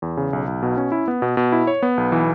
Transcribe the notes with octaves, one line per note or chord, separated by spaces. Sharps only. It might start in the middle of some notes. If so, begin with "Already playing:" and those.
E2
C#3
B1
B1
B2
C#4
E4
B3
B2
B2
E4
C#5
B3
B1
E3